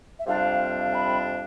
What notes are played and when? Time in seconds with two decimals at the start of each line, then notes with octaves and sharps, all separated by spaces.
0.19 E5
0.27 F2 C3 G3 D4 F5
0.94 B5